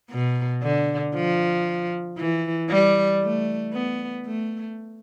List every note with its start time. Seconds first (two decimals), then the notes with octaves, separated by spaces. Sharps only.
0.11 B2
0.62 D3
1.15 F3
2.18 E3
2.69 G3
3.22 A3
3.73 B3
4.26 A3